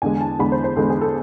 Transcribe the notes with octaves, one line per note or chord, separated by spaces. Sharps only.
E2 D3 G#3 G#5
A5
E2 D3 G#3 B5
C5
C5
E2 D3 G#3 A4
G#4
A4